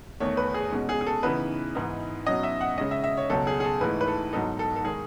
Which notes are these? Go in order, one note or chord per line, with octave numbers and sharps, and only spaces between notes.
E2 D#3 A3 C#5
B4
G#4
B2 G#3 C#4
G#4
G#4
A4
C#3 E3 B3 D#4 B4
G#2 E3 B3 D#4
B2 F#3 C#4 D#5
E5
F#5
C#3 G#3 C#4 D#5
E5
E5
C#5
C#2 B2 F#3 C#4 A4
G#4
G#4
A4
G#2 E3 A3 D#4 B4
B4
A4
G#2 F#3 B3 D#4 A4
A4
A4
D#3 G#3 G#4